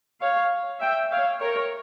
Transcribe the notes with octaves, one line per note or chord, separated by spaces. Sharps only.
C#5 F5
E5 G5
C#5 F5
A#4 C#5